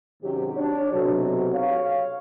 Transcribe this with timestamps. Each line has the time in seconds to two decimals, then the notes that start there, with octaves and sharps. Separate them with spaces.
0.23 G#2 C3 D#3 F#3 C#4 G4
0.57 D4 C#5
0.93 B1 C3 F#3
1.54 C#5 F5